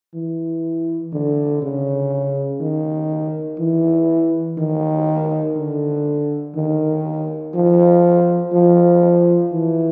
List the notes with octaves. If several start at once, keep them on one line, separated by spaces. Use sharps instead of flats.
E3
D3
C#3
D#3
E3
D#3
D3
D#3
F3
F3
E3